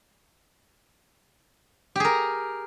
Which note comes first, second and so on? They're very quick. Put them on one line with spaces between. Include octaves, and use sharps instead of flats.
G4 G#4 A#4